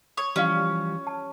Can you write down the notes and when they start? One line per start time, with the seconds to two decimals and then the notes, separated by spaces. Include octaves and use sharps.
0.17 C#5 D#6
0.36 E3 F3 G3 C#4 G4 D5 F5
1.07 A5